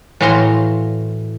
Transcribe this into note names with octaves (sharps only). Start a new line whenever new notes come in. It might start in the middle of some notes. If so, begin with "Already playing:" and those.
A2 E3 F#4 F5 A#5 C6